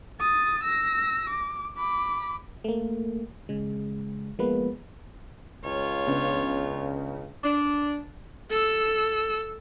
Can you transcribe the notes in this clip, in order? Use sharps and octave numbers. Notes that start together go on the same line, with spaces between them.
D#6 A6
E6 A#6
D6
B5 D6
A3 A#3
C#3 G#3
F3 G#3 A#3 B3 B4
C#2 F4 C#5
C#3 B3 D4
D4
A4 E6